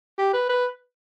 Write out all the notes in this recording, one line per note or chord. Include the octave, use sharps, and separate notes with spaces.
G4
B4
B4